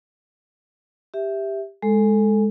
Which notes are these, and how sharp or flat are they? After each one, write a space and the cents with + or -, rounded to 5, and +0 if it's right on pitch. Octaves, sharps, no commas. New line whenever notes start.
G4 +10 E5 +0
G#3 +0 A4 +0